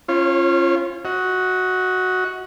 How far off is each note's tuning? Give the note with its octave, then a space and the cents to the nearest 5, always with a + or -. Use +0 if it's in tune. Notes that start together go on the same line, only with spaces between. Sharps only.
C#4 -10 F4 -20 C#5 -45
F#4 +0 D#5 +35